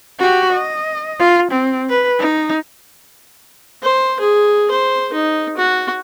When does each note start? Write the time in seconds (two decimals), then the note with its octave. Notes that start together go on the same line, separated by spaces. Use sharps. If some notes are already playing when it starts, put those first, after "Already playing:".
0.19 F#4 G4
0.53 D#5
1.20 F4
1.52 C4
1.90 B4
2.20 D#4
3.83 C5
4.20 G#4
4.71 C5
5.13 D#4
5.57 F#4